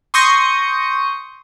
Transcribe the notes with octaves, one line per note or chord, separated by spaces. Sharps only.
C6 C#6 D#6 G6 A#6 C#7